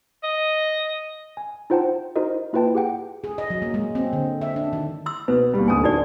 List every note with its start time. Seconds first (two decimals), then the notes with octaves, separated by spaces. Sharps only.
0.23 D#5
1.37 G#5
1.70 D#4 F4 C5 F#5 G5 A5
2.16 D#4 E4 F#4 A#4 C5 D#5
2.53 A#3 E4 F4 B4 G5 A5
2.75 G4 G#4 F#5 G5
3.24 G#4
3.38 D#5
3.50 F#3
3.62 A#3
3.74 G#3
3.95 C4
4.13 D3
4.41 E5
4.56 D4
4.73 D#3
5.06 C6 E6
5.28 B2 B4
5.54 D#2 G3
5.68 D1 D2 C#4 G#5 D#6
5.84 D#4 F#4 D5